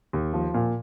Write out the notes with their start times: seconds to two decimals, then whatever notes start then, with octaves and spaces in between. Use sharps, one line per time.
0.13 D#2
0.34 F3
0.54 A#2